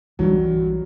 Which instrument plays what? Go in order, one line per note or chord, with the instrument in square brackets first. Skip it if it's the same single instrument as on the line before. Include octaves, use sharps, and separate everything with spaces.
[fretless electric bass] B1 E3 [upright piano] G2 F#3